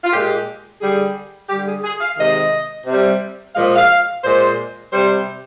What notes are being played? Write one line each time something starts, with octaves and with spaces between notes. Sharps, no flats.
F4
A#2 G#3 G4
D3 G3 G#4
D3 G3 G4
G#4
G#4
F5
C3 D#3 G#3 D#5
C3 G3
A#2 F3 G#3 F5
F5
A#2 G#3 C5
C3 G3 C5